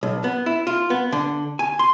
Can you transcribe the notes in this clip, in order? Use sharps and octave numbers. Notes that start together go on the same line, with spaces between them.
B1
B3
E4
F4
B3
D3
G#5
C6